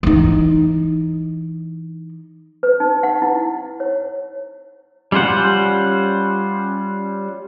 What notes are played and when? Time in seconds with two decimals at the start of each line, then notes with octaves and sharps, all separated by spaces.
0.03 E3 D#4
2.63 B4
2.80 D#4
3.03 F#5
3.22 E4
3.80 C#5
5.12 G3 C#4 F4 C5 F#5